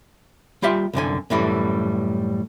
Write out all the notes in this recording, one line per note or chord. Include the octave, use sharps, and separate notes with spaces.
G3 F4 G4 E5 C6
C2 F#2 D3 G#5
F#2 A2 E3 G3